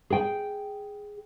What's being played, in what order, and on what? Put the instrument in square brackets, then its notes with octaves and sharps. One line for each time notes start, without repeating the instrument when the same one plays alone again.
[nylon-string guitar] G#4 G5